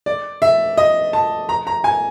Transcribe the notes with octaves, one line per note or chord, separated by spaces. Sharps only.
D5
E5
D#5
A5
A#5
A#5
G#5